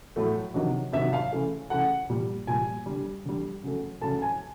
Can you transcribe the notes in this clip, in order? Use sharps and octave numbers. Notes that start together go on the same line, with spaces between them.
A2 F#3 A3
C3 D#3 F#3
C3 D#3 F#3 E5
F5
C#3 E3 A3
C#3 E3 A3 F#5
A#2 G3
A#2 G3 G#5
D3 G3
D3 G3
C#3 F#3 A3
C#3 F#3 A3 A5
G#5